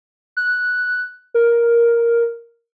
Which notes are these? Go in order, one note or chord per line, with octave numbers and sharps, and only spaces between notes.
F#6
A#4